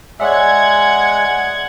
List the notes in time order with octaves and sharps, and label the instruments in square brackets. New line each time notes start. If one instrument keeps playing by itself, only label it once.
[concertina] G#3 [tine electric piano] C#5 D5 E5 [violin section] F#5 G#6